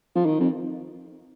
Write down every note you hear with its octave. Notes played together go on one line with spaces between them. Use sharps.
F3
D#3
F2